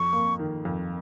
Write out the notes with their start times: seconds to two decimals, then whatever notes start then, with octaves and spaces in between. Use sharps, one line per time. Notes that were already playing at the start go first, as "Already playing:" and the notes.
Already playing: F2 C#6
0.13 A#3
0.39 D#3
0.65 F2